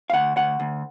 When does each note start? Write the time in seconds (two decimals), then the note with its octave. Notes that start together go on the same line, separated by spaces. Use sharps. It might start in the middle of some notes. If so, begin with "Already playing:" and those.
0.10 F5
0.13 D2 F#5
0.36 D2 F#5
0.60 D2